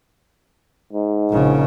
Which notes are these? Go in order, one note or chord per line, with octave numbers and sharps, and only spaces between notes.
G#2
A#1 C#3